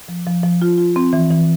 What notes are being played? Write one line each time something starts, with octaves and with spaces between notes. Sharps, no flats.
F3
F3
F3
F4
F4
C4
E3
E3